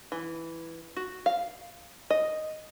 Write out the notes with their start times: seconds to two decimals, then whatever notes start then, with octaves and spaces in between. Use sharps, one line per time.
0.12 E3
0.96 F#4
1.26 F5
2.10 D#5